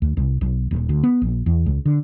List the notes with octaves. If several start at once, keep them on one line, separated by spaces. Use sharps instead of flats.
D2
C2
B1
D#1
D2
B3
A#1
E2
C#2
D3